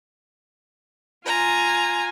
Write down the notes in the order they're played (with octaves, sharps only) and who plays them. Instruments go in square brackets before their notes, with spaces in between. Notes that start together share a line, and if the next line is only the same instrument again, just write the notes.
[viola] F4 G#5 [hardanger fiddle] A#5